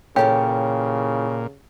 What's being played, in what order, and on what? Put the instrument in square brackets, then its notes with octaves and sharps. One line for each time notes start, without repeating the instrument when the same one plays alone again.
[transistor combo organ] A#2 [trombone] C#3 [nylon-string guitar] E3 A4 C#5 [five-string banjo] G4